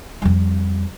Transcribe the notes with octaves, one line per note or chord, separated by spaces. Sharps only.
F2 G3